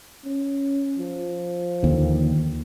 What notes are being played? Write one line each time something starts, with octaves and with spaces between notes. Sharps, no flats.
C#4
F3
D#2 D3